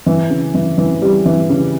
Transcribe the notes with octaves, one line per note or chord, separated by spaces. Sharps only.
E3
C#3
E3
E3
G3
E3
C#3